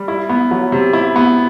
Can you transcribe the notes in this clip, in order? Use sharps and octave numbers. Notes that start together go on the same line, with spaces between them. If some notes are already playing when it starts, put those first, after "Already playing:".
Already playing: G3
E4
B3
F#3
C3
E4
B3